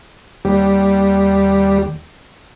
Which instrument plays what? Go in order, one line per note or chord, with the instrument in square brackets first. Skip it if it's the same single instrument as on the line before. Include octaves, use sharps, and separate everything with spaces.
[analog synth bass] D#2 [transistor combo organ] G3